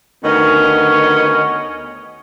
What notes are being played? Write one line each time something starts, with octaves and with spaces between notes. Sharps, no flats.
D2 D#3 B3 C#4 C#5 D#5